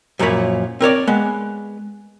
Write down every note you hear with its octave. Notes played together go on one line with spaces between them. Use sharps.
F#2 A#2 F3 A#3 C#5 B5
C4 A#4 C#5 D5
G#3 B3